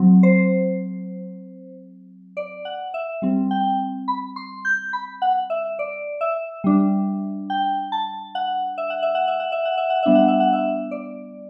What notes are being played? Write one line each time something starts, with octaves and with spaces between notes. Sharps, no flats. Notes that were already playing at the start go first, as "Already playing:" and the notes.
Already playing: F#3 C4
C5
D5
F#5
E5
G3 C4
G5
B5
C6
G6
B5
F#5
E5
D5
E5
G3 D4
G5
A5
F#5
E5
F#5
E5
F#5
E5
F#5
E5
F#5
E5
F#5
G3 B3 D4 E5
F#5
E5
F#5
E5
D5